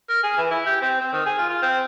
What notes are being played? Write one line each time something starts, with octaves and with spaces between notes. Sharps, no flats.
A#4
G#4
E3
E4
G4
C4
C4
D#3
G#4
F4
F4
C4